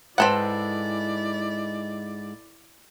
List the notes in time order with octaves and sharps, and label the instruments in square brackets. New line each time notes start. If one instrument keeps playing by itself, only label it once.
[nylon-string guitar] G#2 G#3 B4 [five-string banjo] C4 A4 F#5 [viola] E4 D5